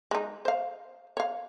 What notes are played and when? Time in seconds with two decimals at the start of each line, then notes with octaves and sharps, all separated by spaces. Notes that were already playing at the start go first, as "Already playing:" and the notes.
0.11 G#3 D#4
0.45 C5 F5
1.17 C#5 F5